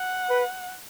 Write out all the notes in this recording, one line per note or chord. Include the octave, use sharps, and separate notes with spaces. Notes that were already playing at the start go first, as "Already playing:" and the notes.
Already playing: F#5
B4